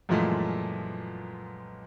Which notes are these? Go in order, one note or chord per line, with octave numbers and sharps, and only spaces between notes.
F#2 A#2 E3 F3 G#3 A3